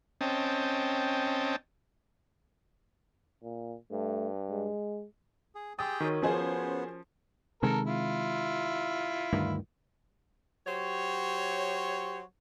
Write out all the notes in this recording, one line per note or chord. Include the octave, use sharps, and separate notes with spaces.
C4 C#4 D#5 G5 A5
A#2
G2 A3
G#3
G#4
G4 G#4 G5 C6 D#6 E6 A6
D#3 F#4 A#4 C#5
F3 B3 C#4 G#4 C5
C3 D#3 G#3 A4 A#4
E4 F4
D2 G2 D#3
F#3 G4 C5 C#5